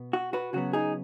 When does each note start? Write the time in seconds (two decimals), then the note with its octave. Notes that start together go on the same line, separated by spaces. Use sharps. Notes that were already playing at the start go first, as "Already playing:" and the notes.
Already playing: B2 B3
0.13 F#4
0.33 F#4 B4
0.53 C#3 F#3 B3 F#4
0.73 D#4 G#4